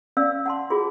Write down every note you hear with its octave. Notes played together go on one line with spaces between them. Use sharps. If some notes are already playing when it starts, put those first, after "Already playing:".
C#4 D5 F5 E6
F#5 A5 C6
F4 F#4 G#4